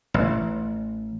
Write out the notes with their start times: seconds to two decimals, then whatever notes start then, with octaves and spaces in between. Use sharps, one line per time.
0.14 A1